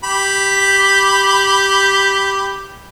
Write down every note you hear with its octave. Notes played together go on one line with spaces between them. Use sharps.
G4 B5